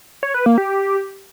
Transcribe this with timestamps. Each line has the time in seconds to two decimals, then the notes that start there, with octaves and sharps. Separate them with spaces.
0.23 C#5
0.34 B4
0.46 A#3
0.58 G4